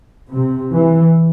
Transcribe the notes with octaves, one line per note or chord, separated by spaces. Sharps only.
C3
E3